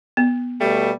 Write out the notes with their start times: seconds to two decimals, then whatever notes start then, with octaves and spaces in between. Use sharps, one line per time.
0.17 B3
0.60 B2 G3 A3